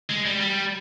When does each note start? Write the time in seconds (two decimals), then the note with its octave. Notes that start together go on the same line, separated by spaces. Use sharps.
0.10 G#3
0.25 G3
0.41 G3